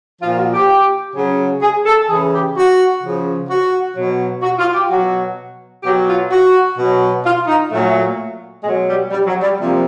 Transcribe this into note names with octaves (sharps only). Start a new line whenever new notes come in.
A#2 F3 F4
F#4
G4
C#3 F#3
G#4
A4
C#3 E3 G#4
G4
F#4
C#3 F3
F#4
B2 F#3
F#4
F4
G4
B2 F#3 F#4
B2 F#3 G4
F4
F#4
B2 F#3
F4
D#4
A#2 F#3 A3
B2 F#3 G#3
G3
G3
F#3
G3
C3 F3 A#3